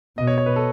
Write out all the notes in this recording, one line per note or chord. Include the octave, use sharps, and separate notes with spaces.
B2 D#5
C#5
C#5
B4
A4